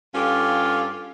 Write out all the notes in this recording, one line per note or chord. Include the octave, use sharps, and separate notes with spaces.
G2 C#4 F4 G4 A4 F5